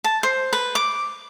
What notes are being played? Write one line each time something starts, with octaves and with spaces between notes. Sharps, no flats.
A5
C5
B4
D6